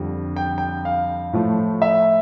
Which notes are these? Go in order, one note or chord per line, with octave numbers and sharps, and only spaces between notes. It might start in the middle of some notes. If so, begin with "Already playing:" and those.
Already playing: F2 D3 G3
G5
G5
F5
A2 F3 A3
E5